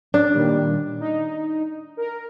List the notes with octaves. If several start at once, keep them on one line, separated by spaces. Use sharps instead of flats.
D4
A#2 D#3 G3
D#4
A#4